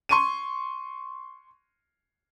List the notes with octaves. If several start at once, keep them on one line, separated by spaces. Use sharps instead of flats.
C6 C#6 D#7